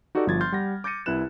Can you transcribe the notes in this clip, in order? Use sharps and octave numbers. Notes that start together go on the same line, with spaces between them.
D#4 F#4 G4 A4 D5
G1 F3 G#6 A6
C6 F6 G6 A6
G3 F#5 A#6
D6 G6 A6 A#6 C#7 D#7
C2 E4 B4 F#6 E7